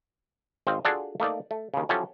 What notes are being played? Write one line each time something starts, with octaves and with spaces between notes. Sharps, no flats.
G#1 C4 C5 D#5 F5
D4 F4 F#4 G#4 A4 D5
A3 A#3 D#4 D5
A3
D#2 C#3
F3 F#3 C#4 E4 G4 A4